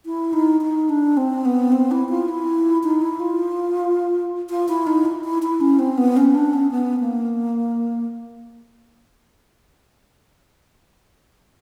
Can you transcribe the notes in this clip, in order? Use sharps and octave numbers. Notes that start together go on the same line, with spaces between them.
E4
D#4
D#4
D4
C4
B3
C4
E4
F4
E4
D#4
E4
F4
F4
E4
D#4
E4
E4
E4
C#4
C4
B3
C#4
D4
C#4
B3
A#3